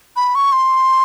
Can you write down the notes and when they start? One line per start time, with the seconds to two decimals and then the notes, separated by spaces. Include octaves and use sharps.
0.16 B5
0.35 C#6
0.52 C6